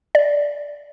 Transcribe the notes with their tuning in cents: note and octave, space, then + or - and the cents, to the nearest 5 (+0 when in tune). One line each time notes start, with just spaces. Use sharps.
D5 -10